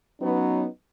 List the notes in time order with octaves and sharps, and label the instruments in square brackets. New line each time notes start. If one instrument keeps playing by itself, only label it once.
[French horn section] F#3 B3 C#4 D#4 B4